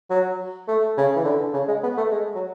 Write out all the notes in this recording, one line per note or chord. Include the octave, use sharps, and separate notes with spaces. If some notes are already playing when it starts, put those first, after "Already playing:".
F#3
A3
C#3
E3
D3
C#3
G#3
B3
A3
G#3
F#3